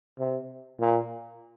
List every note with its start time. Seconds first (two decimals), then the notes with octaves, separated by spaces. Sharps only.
0.19 C3
0.80 A#2